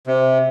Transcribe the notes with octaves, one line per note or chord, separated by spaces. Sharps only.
C3